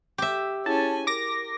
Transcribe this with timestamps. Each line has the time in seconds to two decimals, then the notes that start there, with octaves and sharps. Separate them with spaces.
0.18 G4 E5
0.66 C#4 E4 G#4 G#5 A5
1.07 A#4 D6 A#6